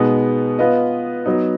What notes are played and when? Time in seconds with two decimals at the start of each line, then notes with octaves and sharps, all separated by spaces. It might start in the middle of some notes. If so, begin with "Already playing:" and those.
Already playing: B2 G#3 B3 D#4
0.59 B3 F4 B4 D#5
1.26 F#3 B3 D#4